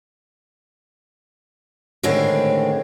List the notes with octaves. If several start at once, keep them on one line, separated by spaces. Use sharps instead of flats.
A2 D3 D#3 G#3 C4